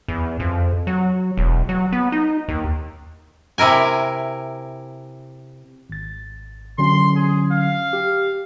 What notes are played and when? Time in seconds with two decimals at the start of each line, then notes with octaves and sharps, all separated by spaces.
0.08 E2
0.40 F2
0.87 F#3
1.37 E1
1.69 F#3
1.92 B3
2.12 D#4
2.48 D#2
3.58 C3 E4 A#4 G#5
5.90 G#1 A6
6.78 D3 F#3 C#4 C6
7.16 G#4
7.52 F5
7.93 G4